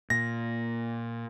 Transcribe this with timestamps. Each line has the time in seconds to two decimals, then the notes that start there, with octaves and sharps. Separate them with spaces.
0.10 A#2 A#6